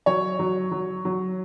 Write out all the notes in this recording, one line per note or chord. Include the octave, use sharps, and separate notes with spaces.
F#3 C#5
F#3
F#3
F#3